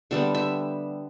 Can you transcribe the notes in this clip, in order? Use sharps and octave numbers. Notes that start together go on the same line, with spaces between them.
D3 G3 B3 E5
E5